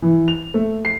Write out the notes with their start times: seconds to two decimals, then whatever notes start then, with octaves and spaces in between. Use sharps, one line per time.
0.02 E3
0.28 F7
0.54 A3
0.85 C7